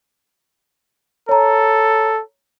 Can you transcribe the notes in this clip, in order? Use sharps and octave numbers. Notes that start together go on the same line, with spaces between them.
A4 C#5 A#5